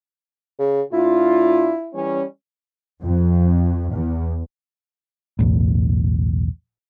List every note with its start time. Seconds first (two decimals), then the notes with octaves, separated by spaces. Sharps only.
0.59 C#3
0.93 A2 D4 E4 F4
1.94 E3 G3 C#4
3.03 F2
3.92 E2
5.39 B1 E2 A2